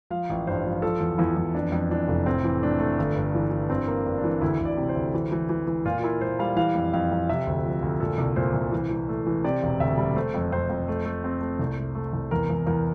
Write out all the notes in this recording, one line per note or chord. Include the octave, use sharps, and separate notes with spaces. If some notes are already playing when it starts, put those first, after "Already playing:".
F3 F5
A1
G2 C5
F3
F3 A4
E2
E2 E4
E2
F2 D4
F2
E3 D4
F1
A2 C4
E3
A3 D4
A3
G1
G2
E3
E3
G2 C4
A#3
G2
D4
E3
D2 E4
D2
D5
C3
C5
D2
E3
E3
E3
E3
A#2 F4
F4
A#3 E4
A#2 C5
G3 F5
E3 F5
F2
F2 F5
F2
C3 E5
D2
F3
D2
A#2 A4
C2
A#2 C5
C2
E3
E3
A3
E3
C3 D5
E1
D2 E5
G3
A3 C5
F2
F2 C5
F2
A3
A3
C4
A3
C2
A3
A3
C2
E2 A#4
E2
E2 A#4